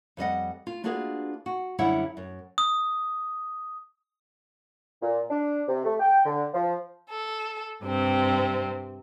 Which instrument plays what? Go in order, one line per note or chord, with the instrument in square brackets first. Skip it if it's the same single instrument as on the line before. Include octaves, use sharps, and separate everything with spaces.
[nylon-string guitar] F2 G3 D#5 F#5
F4
A#3 D4 F4 F#4 G#4 B4
F#4
F#2 D3 G3 E4 E5 F#5
F#2
[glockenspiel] D#6
[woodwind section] A#2
D4
C3
A3
G5
D3
F3
[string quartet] A4
G2 C3 C4